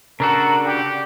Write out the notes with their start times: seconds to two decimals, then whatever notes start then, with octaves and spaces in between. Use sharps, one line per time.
0.20 C#3 D4 F#4 A4 A#4
0.65 D3 G4